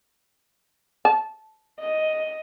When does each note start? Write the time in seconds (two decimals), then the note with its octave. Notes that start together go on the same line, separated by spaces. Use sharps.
1.05 A5
1.80 D#5